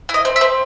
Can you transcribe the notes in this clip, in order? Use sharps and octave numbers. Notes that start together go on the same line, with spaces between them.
E4
D#5
C4
E5
C4